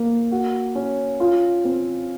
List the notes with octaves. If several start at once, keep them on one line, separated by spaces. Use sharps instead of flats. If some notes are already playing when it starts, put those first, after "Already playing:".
Already playing: A#3
F#4
C#4
F4
C4